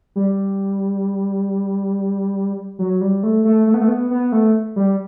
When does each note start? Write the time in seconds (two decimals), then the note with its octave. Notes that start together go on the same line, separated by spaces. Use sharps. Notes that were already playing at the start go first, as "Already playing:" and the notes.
0.16 G3
2.79 F#3
3.01 G3
3.23 A3
3.45 A3
3.67 A3
3.74 B3
3.81 A3
3.88 B3
4.11 B3
4.32 A3
4.76 G3